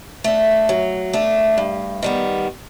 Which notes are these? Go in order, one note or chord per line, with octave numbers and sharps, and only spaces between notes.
A3 D4
F#3
A3 D4
G2
D#3 G3 B3